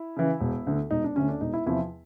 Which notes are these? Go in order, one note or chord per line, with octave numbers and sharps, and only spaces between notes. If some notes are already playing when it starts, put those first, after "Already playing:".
Already playing: E4
C#3 E3
E1
D2 D3
E1 D#4
D4
D2 D3 C#4
D4
E1 D#4
E4
E2 C3 F3 E4